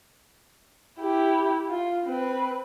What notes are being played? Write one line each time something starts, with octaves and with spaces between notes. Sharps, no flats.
E4 G4
F4
C4 B4